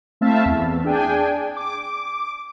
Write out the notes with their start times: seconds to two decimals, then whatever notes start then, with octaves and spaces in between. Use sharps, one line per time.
0.21 A3 C4 E4 E5 F5 A5
0.46 E2
0.84 D4 G#4 G5 G#5
1.57 D6